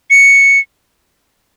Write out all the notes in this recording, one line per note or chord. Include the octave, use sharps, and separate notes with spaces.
C#7